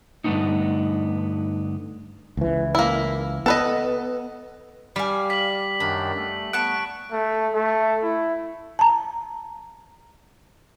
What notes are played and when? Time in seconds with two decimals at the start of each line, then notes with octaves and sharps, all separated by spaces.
0.24 G2 D3 A3 B3 C#4 D#4
2.37 C#2 E3
2.75 A#3 E4
3.46 B3 A4 B4 D#5
4.96 G3 F5 G#5 B5
5.30 D5 B6 F#7
5.80 F#2 D#3 D4 B5
6.16 A3
6.53 B3 A5 C#6 F#6 D7
7.12 A3
7.54 A3
8.03 E4
8.79 A5 A#5